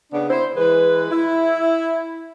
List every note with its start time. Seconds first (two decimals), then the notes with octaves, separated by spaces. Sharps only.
0.12 C#3 B3 D4
0.30 E4 C5
0.57 E3 G#3 B4
1.11 E4